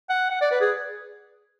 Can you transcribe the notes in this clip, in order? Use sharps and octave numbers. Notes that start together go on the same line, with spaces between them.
F#5
F#5
D5
B4
G#4